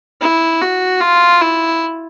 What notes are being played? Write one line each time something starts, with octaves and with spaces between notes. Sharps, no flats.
E4
F#4
F4
E4